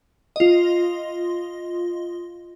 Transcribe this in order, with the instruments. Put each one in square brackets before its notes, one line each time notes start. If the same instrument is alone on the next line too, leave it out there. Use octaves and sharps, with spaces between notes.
[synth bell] F4 D#5